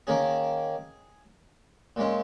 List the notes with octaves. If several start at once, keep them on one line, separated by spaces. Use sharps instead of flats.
D#3 A#3 C#4 G#4
A#2 G#3 C#4